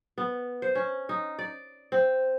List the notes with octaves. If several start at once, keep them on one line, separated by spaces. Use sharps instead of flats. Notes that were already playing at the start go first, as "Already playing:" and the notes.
B3
C5
C#4
D#4
D5
C4